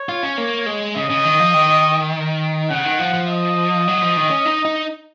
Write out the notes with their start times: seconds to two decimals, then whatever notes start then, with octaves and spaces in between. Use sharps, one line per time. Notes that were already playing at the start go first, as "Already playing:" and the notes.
Already playing: C#5
0.09 F4
0.23 C#4
0.38 A#3
0.66 G#3
0.96 C#3 D#5
1.10 C#3
1.25 D#3
1.40 F3
1.54 D#3
2.70 C#3 F#5
2.85 D#3
2.99 F3
3.14 F3
3.28 D#5
3.88 F#3
4.02 F3
4.17 D#3
4.30 C#4
4.46 D#4
4.65 D#4